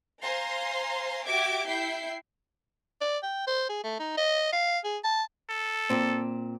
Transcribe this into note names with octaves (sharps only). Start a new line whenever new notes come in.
C5 F5 G#5 A#5 C6
F#4 G4 E5 D6 G#6 D7
E4 E5 G5 G6 C7
D5
G5
C5
G#4
A3
D#4
D#5
F5
G#4
A5
A4
A#2 C4